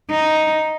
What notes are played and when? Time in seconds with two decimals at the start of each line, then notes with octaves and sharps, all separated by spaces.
0.11 D#4